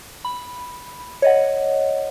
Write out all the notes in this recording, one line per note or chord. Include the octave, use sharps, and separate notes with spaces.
B5
C#5 D#5 F#5